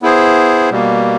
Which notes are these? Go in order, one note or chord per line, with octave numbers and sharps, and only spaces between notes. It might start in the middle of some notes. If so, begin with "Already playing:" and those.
B3 E4 G#4 C5
B2 G3 A#3